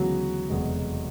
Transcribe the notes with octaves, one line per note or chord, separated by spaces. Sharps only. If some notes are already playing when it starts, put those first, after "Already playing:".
Already playing: D2 C#3 E3 F#3 G#3 B3 F#4
F1 E2 B2 G#3